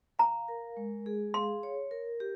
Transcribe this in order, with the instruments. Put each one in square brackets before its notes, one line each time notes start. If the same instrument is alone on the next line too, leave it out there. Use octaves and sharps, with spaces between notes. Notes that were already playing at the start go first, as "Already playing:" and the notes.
[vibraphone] F5 [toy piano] A#5
[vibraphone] A#4
G#3
G#4
[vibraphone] F5 [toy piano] C6
[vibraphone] C#5
A#4
G4